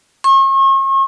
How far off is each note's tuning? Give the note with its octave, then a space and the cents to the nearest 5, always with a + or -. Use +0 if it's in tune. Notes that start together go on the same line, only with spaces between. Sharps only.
C#6 -40